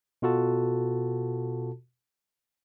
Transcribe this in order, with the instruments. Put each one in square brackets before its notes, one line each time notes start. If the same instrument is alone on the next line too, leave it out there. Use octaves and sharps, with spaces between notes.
[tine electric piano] B2 F4 F#4 A4 A5